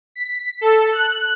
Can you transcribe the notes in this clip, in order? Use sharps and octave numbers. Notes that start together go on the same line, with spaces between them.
B6
A4
F#6